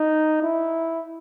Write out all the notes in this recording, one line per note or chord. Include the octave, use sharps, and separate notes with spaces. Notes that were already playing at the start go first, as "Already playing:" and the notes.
Already playing: D#4
E4